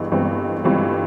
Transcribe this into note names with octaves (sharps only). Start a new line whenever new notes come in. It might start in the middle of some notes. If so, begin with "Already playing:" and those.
Already playing: G1 G2 E3 G#3
G1 G2 E3 G#3 C4
G1 G2 E3 G#3 C4